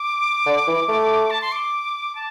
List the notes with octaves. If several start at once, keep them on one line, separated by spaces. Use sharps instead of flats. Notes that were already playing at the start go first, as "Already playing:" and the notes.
Already playing: D6
D3
E3
A3
A5
C6
D6
A5